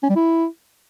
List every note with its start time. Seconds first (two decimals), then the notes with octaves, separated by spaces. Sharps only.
0.03 C#4
0.09 G3
0.16 E4